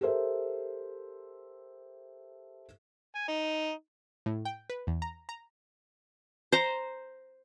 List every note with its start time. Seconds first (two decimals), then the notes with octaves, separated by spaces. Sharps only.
0.01 G4 A4 A#4 C5 E5
3.15 G#5
3.28 D#4
4.26 A2
4.45 G5
4.70 B4
4.87 E2
5.02 A#5
5.29 A#5
6.52 C5 A#5